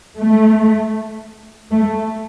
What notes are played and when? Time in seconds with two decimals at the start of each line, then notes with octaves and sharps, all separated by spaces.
0.18 A3
1.71 A3